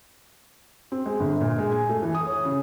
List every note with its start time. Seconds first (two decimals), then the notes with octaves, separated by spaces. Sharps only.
0.92 C4
1.06 G#3
1.20 G1
1.41 A#2
1.59 G#3
1.72 G#5
1.89 A3
2.02 E3
2.15 D#6
2.26 C#5
2.45 C#3